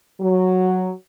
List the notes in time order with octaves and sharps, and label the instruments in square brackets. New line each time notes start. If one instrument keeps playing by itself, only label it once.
[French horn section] F#3